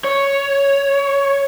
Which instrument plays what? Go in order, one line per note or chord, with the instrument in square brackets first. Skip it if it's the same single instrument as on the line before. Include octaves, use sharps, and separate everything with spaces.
[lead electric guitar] C#5